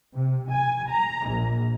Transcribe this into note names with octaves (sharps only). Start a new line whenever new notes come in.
C3
G#5
A#5
A#1